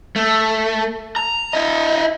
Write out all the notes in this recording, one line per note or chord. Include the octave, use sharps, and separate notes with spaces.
A3
A#5
E4 D#5